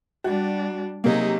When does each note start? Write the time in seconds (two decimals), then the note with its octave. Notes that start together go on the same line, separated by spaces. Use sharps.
0.24 G3 D4 F#4
1.04 C3 F#3 A#3 D#4 G#4